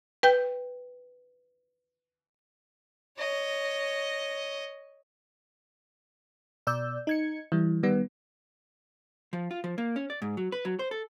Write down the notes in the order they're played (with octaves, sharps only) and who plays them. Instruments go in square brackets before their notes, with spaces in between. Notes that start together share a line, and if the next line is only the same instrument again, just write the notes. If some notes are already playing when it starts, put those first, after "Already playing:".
[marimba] B4 G5 G6
[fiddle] C#5 D#5
[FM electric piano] B2 D5 E6 G6
D#4 G#6 C#7
E3 G3
D#3 G3 B3
[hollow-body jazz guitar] F3
F4
F3
A#3
C#4
D5
G#2
F#3
B4
F#3
C5
A4